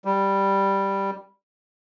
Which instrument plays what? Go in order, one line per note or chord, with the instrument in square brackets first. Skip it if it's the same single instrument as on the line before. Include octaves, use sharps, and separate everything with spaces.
[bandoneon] G3